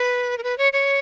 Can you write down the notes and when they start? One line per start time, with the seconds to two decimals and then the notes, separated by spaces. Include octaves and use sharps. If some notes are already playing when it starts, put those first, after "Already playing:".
Already playing: B4
0.38 A#4
0.43 B4
0.58 C#5
0.73 C#5